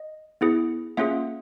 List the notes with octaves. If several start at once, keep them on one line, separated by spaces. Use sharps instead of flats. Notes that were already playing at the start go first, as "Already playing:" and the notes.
Already playing: D#5
B3 E4 G#4
A#3 C#4 F4 G#4 E5 F#5